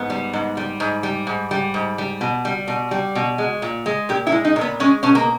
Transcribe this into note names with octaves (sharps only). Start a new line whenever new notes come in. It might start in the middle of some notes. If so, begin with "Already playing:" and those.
Already playing: G#2 B3
G3
G#2
G3
G#2
G3
G#2
G3
G#2
G3
B2
G3
B2
G3
B2
G#3
A#2
G#3
A#2 G4
E4
G#3
D#4
A#2
B3
G#3 C#4
B2 C#4
A#3